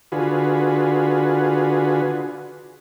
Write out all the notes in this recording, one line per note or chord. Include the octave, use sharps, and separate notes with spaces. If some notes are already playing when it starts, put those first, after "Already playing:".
D3 F4 F#4 G#4 B4